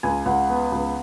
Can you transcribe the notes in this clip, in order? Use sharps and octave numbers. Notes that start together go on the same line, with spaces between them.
C#2 G#5
C#2 F#5
B3
C#2